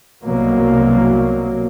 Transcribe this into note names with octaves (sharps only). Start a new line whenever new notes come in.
C2 B2 F#3 A#3